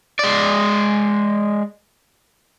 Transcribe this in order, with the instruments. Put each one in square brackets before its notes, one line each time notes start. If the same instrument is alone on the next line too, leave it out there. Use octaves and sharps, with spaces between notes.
[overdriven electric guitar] G#3 D5